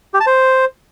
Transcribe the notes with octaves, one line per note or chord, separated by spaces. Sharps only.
G4
A5
C5